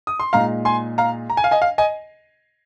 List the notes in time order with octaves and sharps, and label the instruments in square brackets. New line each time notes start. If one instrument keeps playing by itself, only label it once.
[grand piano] D#6
C6
A#2 G#3 D#4 F5 A#5
G#5 C6
F5 A#5
A#5
G#5
F5
D#5 G#5
F5
D#5 G#5